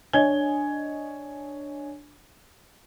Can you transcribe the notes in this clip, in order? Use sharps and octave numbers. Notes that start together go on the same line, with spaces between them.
D4 C#5 D#5 G#5 G#6 G7